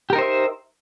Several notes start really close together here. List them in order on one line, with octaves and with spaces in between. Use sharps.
G4 A#4 D#4 C5 E5